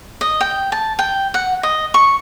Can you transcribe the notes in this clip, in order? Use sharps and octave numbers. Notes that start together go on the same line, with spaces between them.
D#5
G5
A5
G5
F#5
D#5
C#6